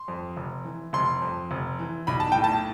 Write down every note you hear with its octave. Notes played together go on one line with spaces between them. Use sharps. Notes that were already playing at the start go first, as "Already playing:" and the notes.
Already playing: C6
F2
F1
E3
F1 C6
F2
F1
E3
B1 B5
A5
A2 G5
A5